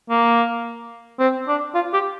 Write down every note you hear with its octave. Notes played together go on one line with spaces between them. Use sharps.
A#3
C4
D4
F4
G4